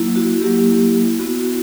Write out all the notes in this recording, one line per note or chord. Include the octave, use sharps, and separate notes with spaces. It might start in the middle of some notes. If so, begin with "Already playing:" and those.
Already playing: F#3 A#3 E4
F#4
F#3 A#3 E4 G4
B3 E4 F#4